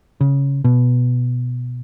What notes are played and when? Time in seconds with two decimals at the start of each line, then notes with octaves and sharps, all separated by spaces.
0.21 C#3
0.65 B2